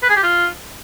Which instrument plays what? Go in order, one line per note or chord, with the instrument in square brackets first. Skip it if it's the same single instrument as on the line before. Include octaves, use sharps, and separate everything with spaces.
[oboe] B4
G#4
G4
F4